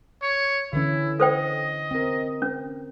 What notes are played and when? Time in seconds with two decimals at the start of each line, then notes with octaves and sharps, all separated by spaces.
0.22 C#5
0.73 D3 E3 C#4 E4
1.20 A4 C5 D#5 G5
1.91 C4 A#4
2.42 C#4